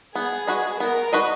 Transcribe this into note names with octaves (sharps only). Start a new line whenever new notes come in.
B3 G#4
F#4 B4 D#5
B3 A#4
F#4 B4 D#5